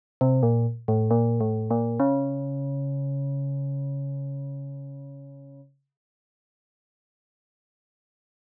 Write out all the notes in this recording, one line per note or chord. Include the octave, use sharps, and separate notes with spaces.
C3
A#2
A2
A#2
A2
A#2
C#3